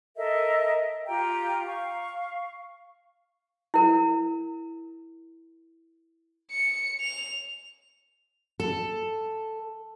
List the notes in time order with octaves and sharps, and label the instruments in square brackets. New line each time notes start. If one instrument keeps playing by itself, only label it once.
[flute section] A4 A#4 D#5 E5
F4 G4 G5 A#5
F5 C#6
[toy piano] E4 A#4
[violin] C#7
F7
[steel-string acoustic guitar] A4